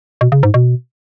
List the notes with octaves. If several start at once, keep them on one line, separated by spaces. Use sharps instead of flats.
B2
C#3
G#2
B2